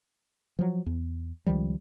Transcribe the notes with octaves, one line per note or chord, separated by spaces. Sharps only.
F3 F#3
E2
C#2 D#3 F3 G3